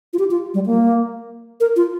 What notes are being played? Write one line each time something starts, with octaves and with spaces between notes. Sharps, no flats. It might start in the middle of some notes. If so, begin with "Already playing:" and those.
F4
G4
F4
G3
A#3
A#4
F4